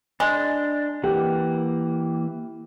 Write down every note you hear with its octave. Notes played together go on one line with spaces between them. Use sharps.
G#3 D4
E3 A#3 G4 F#5